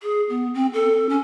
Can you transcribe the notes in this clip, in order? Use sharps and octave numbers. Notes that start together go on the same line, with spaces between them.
G#4
B3
C4
A4
C#4